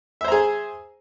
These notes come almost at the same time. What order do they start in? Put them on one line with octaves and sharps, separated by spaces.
E5 C5 A#5 G#4